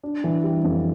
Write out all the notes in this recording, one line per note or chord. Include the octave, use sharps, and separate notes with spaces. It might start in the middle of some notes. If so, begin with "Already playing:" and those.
D4
E3
G3
F2